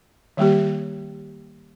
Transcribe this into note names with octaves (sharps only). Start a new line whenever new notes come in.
D#3 G3 A#3 G4